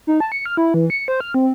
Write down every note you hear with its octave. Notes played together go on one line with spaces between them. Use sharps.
D#4
A5
C#7
F6
E4
E3
C#7
C5
F6
C4